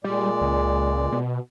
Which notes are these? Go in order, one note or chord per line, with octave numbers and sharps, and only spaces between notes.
A#2 G3 G#3 D5
C#2
B2